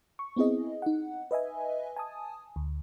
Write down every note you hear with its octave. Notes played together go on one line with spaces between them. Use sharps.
C#6
B3 C4 E4 G#4 D#5
D#4 F#5
B4 D#5 E5 G#5
G#5 A5 D#6
D2